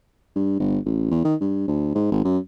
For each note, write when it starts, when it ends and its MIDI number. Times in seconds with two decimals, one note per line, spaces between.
0.36 0.58 43
0.60 0.79 31
0.86 1.08 33
1.11 1.24 40
1.25 1.35 51
1.41 1.67 43
1.68 1.94 38
1.95 2.11 44
2.12 2.22 32
2.24 2.38 42